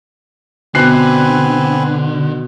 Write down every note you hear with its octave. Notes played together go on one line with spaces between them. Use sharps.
B2 D3 C4 B4 G#5 F#6 C7